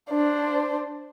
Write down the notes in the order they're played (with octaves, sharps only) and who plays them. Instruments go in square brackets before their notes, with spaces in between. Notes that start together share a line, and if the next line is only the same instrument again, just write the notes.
[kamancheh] D4 C5